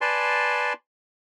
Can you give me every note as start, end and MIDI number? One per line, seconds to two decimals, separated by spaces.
0.01 0.73 71
0.01 0.73 74
0.01 0.73 80
0.01 0.73 81
0.01 0.73 84